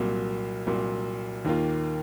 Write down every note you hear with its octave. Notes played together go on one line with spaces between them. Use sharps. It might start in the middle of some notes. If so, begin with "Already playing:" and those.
Already playing: C2 A#2 F#3 A#3
C2 A#2 F#3 A#3
D#2 D#3 A#3 F4